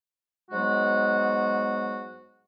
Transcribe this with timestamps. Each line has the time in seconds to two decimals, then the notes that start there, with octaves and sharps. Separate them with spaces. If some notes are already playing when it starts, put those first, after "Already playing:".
0.51 G#2 F#3 G#3 B3 F#4